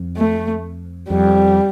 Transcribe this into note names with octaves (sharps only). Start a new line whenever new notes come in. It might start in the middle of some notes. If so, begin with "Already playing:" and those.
Already playing: F2
A3
F2 G3